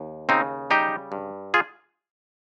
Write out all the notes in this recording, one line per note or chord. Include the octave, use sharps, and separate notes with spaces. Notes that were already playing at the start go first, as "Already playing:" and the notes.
Already playing: D#2
C#3 C4 D#4
G3 D#4 G4
G2
F4 G#4